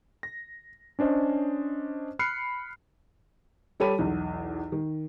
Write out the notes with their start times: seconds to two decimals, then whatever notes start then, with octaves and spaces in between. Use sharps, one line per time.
0.23 A#6
0.99 C#4 D4 C5 D#5
2.19 B5 F6 F#6 C7 C#7
3.80 G3 G4 A4 C#5 B5 D#7
3.99 B1 E2
4.72 D#3